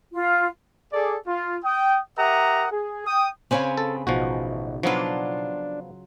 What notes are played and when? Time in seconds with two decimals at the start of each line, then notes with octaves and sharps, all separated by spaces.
0.13 F4
0.93 G#4 A4 D5
1.26 F4
1.64 G5 D#6
2.17 G4 A#4 E5 F#5 A#5 D#6
2.71 G#4
3.07 G5 D#6
3.51 C#3 C4 B4 C#5 F5 G#5
3.77 A4
4.07 A1 B2 F3 D#4 F#4
4.83 F3 F#3 B3 D4 F4